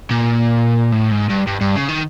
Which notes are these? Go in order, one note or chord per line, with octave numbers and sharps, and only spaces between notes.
A#2
A2
G#2
G2
G2
G2
C#3
D#3